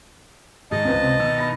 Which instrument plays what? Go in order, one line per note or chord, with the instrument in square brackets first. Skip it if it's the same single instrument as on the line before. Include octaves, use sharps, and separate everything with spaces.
[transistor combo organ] G#2 D#3 [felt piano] G#4 [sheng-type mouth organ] D#5 A5
[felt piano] C#2 C4 B4
[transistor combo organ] C3
[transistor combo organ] B2 D#3 [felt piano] E6
[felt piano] B5 A#6